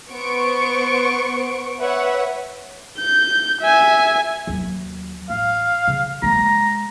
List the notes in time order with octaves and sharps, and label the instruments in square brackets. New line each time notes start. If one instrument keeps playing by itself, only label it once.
[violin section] B3 C5 C#6 D7
B4 C#5 E5 F#5
[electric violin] G6
E5 G#5
[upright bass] D#2 F#3
[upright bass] A1 [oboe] F5
[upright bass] C#3
[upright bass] G#3 A#3 [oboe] A#5